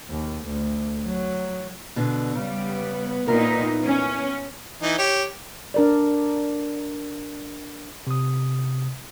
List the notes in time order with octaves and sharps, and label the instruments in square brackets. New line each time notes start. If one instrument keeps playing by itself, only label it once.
[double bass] D#2
D2
F#3
[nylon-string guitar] B2 D3
[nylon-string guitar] C#3 [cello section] G3 [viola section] B3
[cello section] A#2 D#4 [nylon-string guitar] E4 A#4
[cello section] C#4
[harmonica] E3 D#4
G4 C#5
[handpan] D4 A#4 D5
[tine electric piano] C3 D#6